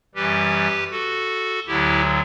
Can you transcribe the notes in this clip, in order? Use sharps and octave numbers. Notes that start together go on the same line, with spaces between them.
F#2 E3 G3 G4 B4
F#4 A4
D2 D3 F#3 E4 G4